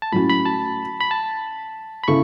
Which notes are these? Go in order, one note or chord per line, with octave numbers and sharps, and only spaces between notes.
A5
A2 F#3 C#4 F#4 B5
B5
A5
B5
A5
B5
C#3 E4 A4 C#6